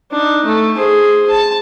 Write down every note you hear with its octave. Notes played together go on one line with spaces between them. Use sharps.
D4 D#4
A3
G#4 C5
A5